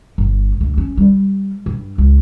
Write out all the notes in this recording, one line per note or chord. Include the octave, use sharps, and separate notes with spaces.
G1
D2
C#4
G3
G2
C#2